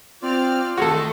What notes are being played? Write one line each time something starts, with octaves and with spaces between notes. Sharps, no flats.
C4 F4 D5 F6
D#3 A3 F#4 G#4 A4